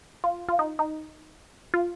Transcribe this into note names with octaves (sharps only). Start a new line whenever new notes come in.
F4
F4
D#4
D#4
F4